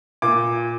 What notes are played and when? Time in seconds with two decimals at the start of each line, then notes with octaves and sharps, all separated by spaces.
0.22 A#2 D6